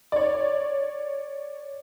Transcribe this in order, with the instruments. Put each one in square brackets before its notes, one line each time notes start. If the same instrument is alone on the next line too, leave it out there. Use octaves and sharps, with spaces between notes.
[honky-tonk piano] C#5 D5